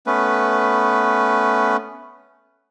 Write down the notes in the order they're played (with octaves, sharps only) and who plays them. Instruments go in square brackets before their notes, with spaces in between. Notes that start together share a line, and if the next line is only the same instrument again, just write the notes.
[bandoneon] A3 B3 C#4 B4